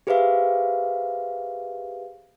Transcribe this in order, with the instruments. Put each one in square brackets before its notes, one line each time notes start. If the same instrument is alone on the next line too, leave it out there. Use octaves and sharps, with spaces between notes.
[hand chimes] G4 G#4 B4 C5 E5 F5